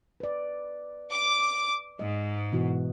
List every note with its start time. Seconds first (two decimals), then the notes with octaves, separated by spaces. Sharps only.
0.20 B4 D5
1.12 D6
1.99 G#2 D#5
2.52 B2 E3 F#4